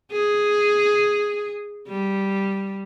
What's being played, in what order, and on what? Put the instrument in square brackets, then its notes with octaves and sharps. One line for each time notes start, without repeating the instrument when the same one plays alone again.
[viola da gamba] G#4
G3